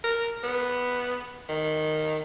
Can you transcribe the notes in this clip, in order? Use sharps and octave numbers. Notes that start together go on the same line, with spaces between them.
A#4
B3
D#3